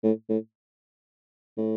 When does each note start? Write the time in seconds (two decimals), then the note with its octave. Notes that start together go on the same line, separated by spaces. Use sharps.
0.04 A2
0.29 A2
1.58 A2